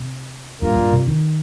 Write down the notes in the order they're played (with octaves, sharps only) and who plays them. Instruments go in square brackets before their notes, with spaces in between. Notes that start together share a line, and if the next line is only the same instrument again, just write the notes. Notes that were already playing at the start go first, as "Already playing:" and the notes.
Already playing: [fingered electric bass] C3
[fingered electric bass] G2 [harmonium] A#2 A#3 F4 A#4
[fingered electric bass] G2
C3
D#3